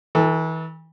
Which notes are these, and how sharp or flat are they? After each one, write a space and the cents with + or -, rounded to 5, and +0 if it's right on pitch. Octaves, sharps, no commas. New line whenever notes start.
E3 -35 A4 +0